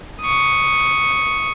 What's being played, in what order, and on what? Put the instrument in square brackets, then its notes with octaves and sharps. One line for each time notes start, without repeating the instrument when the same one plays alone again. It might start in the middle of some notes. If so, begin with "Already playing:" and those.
[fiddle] C#6 D#6